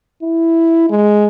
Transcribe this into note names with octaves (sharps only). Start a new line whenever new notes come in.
E4
G#3